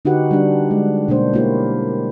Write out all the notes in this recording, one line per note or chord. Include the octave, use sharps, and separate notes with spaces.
D3 D#4 F#4 G4 B4 F#5
G3 D4
G#3
B2 A#3 D4 C5
A#3 D4 E4 G4 C#5